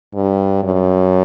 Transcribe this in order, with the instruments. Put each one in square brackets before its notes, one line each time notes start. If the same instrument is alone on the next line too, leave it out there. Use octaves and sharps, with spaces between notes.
[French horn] G2
F#2